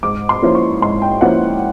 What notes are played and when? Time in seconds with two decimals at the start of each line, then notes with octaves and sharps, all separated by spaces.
0.03 G#2 D6
0.29 C6
0.42 F3 A#3 C#4 E4
0.55 C#6
0.82 G#2 C6
1.02 G5
1.21 F3 A#3 C#4 E4 F#5